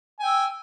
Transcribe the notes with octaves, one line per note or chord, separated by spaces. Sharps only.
G5 G#5 E6